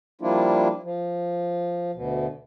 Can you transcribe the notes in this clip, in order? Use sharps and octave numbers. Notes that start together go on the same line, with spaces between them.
F3 G3 A#3 D4 E4 F4
F3
D2 B2